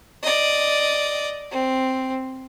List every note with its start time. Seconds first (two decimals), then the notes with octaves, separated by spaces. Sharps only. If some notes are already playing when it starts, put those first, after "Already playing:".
0.23 D5 D#5
1.51 C4